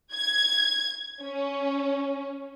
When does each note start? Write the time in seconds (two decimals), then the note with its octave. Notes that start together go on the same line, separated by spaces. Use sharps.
0.14 G#6
1.22 C#4